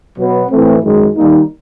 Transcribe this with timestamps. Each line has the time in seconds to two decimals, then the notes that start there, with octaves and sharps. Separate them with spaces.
0.17 B2 F#3 B3
0.50 A2 E3 A3 C4
0.82 F#2 D#3 G#3
1.15 D#3 G3 A#3 D#4